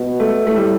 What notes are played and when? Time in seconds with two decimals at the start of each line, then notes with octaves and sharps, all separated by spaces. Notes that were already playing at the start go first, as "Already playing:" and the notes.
Already playing: B2
0.20 A3
0.47 A2 A3
0.56 G3